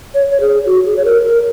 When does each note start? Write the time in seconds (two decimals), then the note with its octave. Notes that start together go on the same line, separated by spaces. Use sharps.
0.14 C#5
0.31 C#5
0.40 G#4
0.66 F#4
0.86 G#4
0.96 C#5
1.05 A#4
1.25 A#4